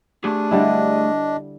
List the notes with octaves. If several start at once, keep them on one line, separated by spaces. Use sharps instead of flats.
A3 D4 G4 G#4
D3 G3 E4 D#5